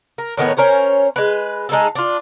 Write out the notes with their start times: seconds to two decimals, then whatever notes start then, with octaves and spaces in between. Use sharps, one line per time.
0.18 A#4
0.37 A2 D#3 B3 C#5
0.57 C#4 A#4 C5 C#5
1.16 G#3 B4
1.69 G#3 D#4 G#4 A4
1.95 D4 F4